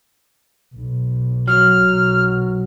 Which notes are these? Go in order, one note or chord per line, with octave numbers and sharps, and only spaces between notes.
B1
F#3 F6
B1